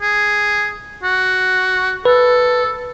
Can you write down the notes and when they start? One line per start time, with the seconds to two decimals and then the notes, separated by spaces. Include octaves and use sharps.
0.02 G#4
1.03 F#4
2.05 A4 B4